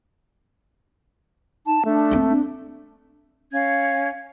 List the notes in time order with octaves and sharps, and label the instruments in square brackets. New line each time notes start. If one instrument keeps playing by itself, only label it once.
[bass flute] D#4 [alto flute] A5
[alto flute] A3 [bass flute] D4
[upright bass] A#3 C4
[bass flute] D4
[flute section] C#4 F5 G#6